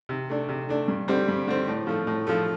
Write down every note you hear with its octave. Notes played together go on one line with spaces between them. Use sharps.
C3
A3 D4
C3
A3 D4
G2
D3 G3 C4
G2
D3 G3 C4
A2
F3 A3
A2
F3 A3